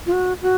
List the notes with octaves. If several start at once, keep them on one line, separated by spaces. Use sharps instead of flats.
F4
F#4
F#4